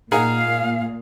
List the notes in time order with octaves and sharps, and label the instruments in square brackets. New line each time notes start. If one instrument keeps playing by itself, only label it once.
[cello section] A#2 [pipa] D#4 A#4 F#5 [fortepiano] G#4 [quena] F5